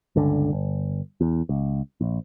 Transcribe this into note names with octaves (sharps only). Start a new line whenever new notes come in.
G1 C#2 D3
G1
E2
C#2
A#1